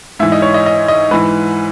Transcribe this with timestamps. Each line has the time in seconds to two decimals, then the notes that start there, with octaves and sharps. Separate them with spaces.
0.19 G#2 E3 E5
0.32 D#5
0.42 C#5
0.54 D#5
0.66 D#5
0.88 D#5
1.11 G#2 E3 B4